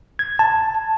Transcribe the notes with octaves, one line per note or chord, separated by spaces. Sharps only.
G#6
A5